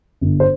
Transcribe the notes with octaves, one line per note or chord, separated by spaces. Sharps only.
G1
C5